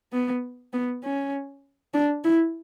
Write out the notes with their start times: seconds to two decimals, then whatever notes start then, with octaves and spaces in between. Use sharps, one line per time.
0.13 B3
0.73 B3
1.04 C#4
1.94 D4
2.24 E4